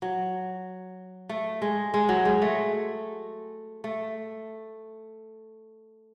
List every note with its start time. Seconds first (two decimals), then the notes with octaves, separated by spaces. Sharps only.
0.02 F#3
1.29 A3
1.62 G#3
1.94 G#3
2.09 F#3
2.25 G#3
2.42 A3
3.84 A3